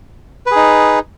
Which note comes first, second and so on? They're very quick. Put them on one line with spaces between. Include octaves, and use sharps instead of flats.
B4 G#4 D#4